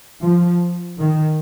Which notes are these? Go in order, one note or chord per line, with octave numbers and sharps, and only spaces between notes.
F3
D#3